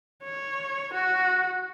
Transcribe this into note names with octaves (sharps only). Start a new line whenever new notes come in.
C#5
F#4